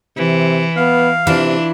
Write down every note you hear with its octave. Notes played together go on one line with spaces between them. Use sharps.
C3 E3
B3 F5
C3 E3 D4 E4 F4